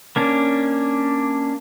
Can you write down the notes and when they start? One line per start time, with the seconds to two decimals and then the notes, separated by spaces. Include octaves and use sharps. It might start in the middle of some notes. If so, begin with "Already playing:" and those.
0.16 A#3 C#4 D4